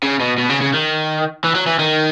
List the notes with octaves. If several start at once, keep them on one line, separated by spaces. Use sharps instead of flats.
C#3
B2
B2
C#3
C#3
D#3
E3
F#3
E3
D#3